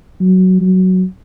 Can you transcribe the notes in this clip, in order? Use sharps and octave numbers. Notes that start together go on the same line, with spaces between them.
F#3
F#3